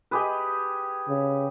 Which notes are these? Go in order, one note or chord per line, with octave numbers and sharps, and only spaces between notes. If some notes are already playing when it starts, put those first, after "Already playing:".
G4 G#4 B4
C#3